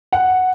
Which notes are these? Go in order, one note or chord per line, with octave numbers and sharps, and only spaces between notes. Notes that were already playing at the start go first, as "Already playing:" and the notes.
F#5